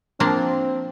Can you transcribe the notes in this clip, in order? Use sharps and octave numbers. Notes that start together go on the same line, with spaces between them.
F3 A#3 C4 D4